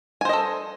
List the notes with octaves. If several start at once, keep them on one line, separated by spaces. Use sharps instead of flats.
A4 C5 D#5 G#5